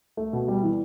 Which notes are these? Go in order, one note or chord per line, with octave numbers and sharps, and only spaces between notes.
A3
B2
G3
E3